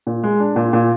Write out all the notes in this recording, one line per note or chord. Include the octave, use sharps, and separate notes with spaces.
A#2
G#3
D4
A#2
A#2